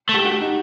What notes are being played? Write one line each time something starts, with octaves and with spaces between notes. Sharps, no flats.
A3
G4
F#4
D#4